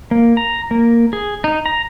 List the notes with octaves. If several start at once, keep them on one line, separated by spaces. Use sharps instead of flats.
A#3
A#5
A#3
G#4
D#4
A#5